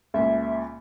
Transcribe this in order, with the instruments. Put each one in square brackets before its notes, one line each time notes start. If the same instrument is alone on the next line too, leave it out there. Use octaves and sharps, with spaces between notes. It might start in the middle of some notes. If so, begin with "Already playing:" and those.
[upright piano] C#2 A#2 [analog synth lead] E5